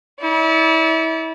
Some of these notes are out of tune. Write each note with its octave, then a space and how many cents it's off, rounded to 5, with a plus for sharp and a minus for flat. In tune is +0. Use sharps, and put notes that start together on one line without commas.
E4 -35 D5 -30